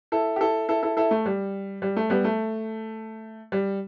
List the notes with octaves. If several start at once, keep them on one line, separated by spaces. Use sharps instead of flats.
E4 A4
G4
E4 A4
E4 A4
E4 A4
E4 A4
A3
G3
G3
A3
G3 B3
A3
G3